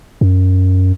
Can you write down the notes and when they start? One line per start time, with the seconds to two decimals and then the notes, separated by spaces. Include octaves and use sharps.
0.21 F#2